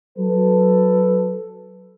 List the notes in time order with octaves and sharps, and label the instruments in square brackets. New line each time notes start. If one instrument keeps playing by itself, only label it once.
[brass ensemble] F#3 A4 B4